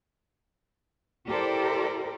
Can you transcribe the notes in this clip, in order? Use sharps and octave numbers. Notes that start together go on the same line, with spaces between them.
E4 G4 A4 A#4 C5 D5